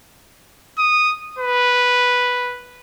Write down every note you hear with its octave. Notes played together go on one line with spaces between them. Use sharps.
D#6
B4